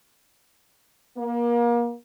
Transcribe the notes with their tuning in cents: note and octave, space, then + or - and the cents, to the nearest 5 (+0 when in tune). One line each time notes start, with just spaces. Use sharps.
A#3 +30